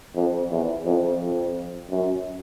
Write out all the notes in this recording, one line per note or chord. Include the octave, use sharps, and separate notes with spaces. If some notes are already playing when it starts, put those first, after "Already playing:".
F2
E2
F2
F2
F#2